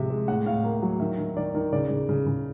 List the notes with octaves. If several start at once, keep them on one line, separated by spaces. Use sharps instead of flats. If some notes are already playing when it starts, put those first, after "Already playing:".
Already playing: C3 F3 G#3 E5
G#3
A2 F#5
A2 F5
A#3
F#3
D#3 E5
D#3
D#3 D5
D#3
C#3 D5
C#3
C#3
C#3